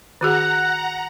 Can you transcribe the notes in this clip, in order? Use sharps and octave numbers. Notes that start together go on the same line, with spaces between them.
D#3 F#4 G#4 F#5 A#5 F#6